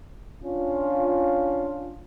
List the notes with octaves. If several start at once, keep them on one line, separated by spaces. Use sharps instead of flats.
C#4 D4 F4